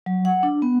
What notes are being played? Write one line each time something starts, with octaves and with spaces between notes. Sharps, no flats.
F#3
F#5
D4
B3